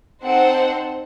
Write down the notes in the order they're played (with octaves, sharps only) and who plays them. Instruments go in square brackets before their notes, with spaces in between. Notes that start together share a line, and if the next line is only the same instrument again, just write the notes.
[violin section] C4 D#4 A4 C5 F#5